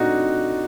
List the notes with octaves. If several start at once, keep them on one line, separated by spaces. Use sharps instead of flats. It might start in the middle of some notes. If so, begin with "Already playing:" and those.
Already playing: A#2 A3 C4 D4 D#4 F#4